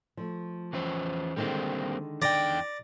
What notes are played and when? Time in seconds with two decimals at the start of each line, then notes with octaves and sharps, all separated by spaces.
0.17 F3 A3
0.73 E3 C#4 C5
1.36 D3 D#3 G3 G#3 A#3 C4
2.22 E2 D5 G5 A#5